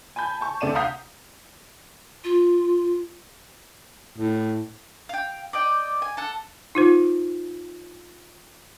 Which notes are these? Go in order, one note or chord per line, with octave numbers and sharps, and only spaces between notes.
G#5 A5 B5 G6
A5 C#6
D2 C3 A4 D5 D#7 E7
F5 F#5 A#5 D#6 G6 B6
F4
A2
F5 G5
D5 D#5 G5
G#5
A4 F#5
D#4 F4 C5